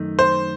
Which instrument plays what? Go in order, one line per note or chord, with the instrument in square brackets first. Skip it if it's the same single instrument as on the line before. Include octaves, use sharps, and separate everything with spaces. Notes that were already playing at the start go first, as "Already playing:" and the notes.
Already playing: [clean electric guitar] F#2 D#3 A3 D#4
[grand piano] C5